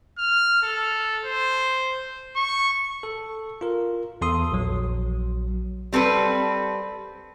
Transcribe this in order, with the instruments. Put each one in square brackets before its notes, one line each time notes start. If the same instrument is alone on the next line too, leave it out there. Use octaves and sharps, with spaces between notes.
[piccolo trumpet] F6
A4
C5
C#6
[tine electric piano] A4
F4 A#4
E2 A4 C6 D#6
A#1 F#3
[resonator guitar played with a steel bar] G3 C4 A4 B4